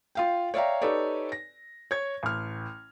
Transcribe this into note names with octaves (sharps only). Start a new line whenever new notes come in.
F4 F5 G5
C#5 D5 E5 F5 G5 A#5
D#4 G4 A4 B4 C#5 D5
A#6
C#5 G#6
A1 F6